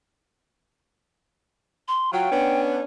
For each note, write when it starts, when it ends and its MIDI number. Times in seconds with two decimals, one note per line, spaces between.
1.88 2.13 84
2.13 2.31 54
2.13 2.31 65
2.13 2.61 79
2.32 2.84 59
2.32 2.84 61
2.32 2.84 62